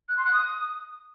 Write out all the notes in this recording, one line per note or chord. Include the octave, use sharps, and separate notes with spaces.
F#6
C6
F#6
D#6